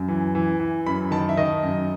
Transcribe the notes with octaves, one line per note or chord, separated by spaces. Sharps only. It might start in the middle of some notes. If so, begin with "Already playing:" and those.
Already playing: F#2
E3
E3
E3
F#2 B5
D#3 A5
E5
D#3 D#5
F#2